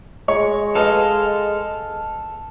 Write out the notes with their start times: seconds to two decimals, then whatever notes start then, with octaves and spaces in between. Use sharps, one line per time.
0.28 G#3 C#5
0.75 A4 B4 D#5 F5